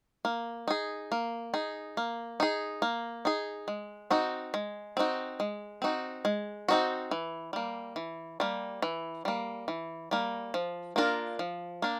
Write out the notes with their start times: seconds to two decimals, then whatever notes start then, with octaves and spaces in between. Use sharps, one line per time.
0.25 A#3
0.68 D#4 G#4
1.12 A#3
1.54 D#4 G#4
1.97 A#3
2.40 D#4 G#4
2.82 A#3
3.25 D#4 G#4
3.68 G#3
4.10 C4 D#4 F#4
4.54 G#3
4.97 C4 D#4 F#4
5.40 G#3
5.82 C4 D#4 F#4
6.25 G#3
6.68 C4 D#4 F#4
7.11 E3
7.53 G3 A#3
7.96 E3
8.40 G3 A#3
8.82 E3
9.25 G3 A#3
9.68 E3
10.11 G3 A#3
10.54 F3
10.96 A#3 D4 F4 A#4
11.39 F3
11.82 A#3 D4